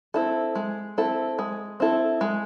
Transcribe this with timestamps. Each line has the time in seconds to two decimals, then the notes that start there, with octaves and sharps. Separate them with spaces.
0.14 C4 E4 A4
0.55 G#3
0.98 C4 E4 A4
1.39 G#3
1.80 C4 E4 A4
2.21 G#3